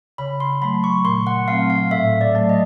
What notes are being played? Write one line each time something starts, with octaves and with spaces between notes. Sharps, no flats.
C#3 B5
C6
F#3 A3 B5
C#6
A#2 C6
F#5
F#3 A3 C4 F5
F5
A2 E5
D5
F#3 A3
D#5